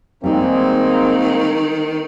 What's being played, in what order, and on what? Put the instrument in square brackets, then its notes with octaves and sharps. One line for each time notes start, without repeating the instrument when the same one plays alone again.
[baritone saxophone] D#3 [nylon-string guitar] G3 D#4 [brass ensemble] G#3 A#3 C4